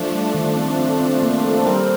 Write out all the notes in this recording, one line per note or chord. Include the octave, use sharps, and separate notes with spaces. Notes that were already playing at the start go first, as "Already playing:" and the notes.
Already playing: F3 A3 D4
G3
D#3
C4
C4
C4
A#3
A4
C5
G3 C4 A#4